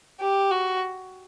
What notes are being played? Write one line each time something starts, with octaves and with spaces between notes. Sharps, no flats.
G4
F#4